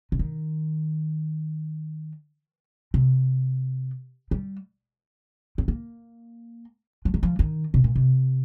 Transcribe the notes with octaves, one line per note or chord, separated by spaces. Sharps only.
C3
D#3
C3
G3
C4
A#3
F3
D#3
F3
D#3
C3
A#2
C3